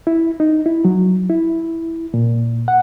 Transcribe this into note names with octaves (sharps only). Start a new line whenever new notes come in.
E4
D#4
E4
F#3
E4
A#2
F#5